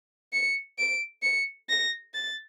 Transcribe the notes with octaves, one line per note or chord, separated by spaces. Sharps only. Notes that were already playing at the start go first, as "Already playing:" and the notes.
C#7
D7
C#7
A#6
A6